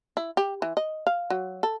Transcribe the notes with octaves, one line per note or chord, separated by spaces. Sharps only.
E4
G4
E3
D#5
F5
F#3
A4